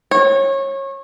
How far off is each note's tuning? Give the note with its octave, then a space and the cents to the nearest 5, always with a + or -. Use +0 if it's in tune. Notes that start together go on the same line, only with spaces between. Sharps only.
C#5 -25